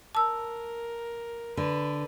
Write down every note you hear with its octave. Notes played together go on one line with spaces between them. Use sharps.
A#4 A5 E6
D3 B4